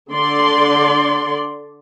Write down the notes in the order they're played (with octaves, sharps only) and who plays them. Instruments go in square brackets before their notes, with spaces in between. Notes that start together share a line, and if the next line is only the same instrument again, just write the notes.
[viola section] D3 D5 C6